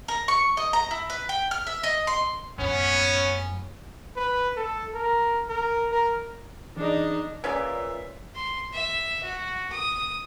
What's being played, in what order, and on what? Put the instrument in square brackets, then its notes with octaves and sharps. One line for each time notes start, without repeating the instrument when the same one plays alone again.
[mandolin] A#4
C#6
D#5
A#5
E4
B4
G5
F6
E5
D#5
C6
[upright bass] F#2 A2 [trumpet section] B3 C#4
[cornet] B4
A4
A#4
A#4
A#4
[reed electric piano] E3 G#4 [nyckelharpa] D4 D#4
[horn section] A#2 [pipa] C#4 G#4 D5 [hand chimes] B4 [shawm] E5
[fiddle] C6
E5
F#4
D#6